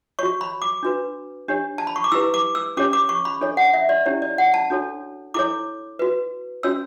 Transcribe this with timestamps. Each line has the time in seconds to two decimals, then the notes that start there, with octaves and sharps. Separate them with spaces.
0.19 F#4 C#5 C#6
0.41 B5
0.62 D6
0.83 D4 F#4 B4
1.48 D4 G4 C#5
1.78 A5
1.87 B5
1.96 C#6
2.04 D6
2.12 E4 G4 B4 E6
2.34 D6
2.55 E6
2.77 C#4 G4 C#5 D6
2.93 D6
3.09 C#6
3.25 B5
3.41 D4 A4 C#5
3.57 F#5
3.74 E5
3.89 D5
4.06 C#4 E4 G4 C#5
4.22 D5
4.38 F#5
4.54 A5
4.70 D4 F#4 A4 C#5
5.34 E4 A4 C#5 D6
5.99 F#4 B4
6.63 C#4 F#4 C#5 E6